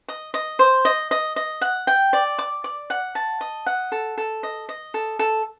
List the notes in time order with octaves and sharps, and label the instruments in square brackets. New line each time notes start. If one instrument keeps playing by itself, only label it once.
[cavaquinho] D#5
D#5
C5
D#5
D#5
D#5
F#5
G5
D5
D6
D5
F#5
A5
D#5
F#5
A4
A4
D#5
D#5
A4
A4